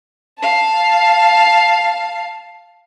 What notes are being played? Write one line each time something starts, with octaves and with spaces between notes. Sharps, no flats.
F5 A5